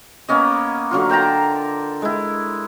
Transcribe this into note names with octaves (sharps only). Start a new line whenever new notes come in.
A#3 B3 C#4 D#5
D3 F#3 F4
A#4 G5 A5 A#5
G#3 E4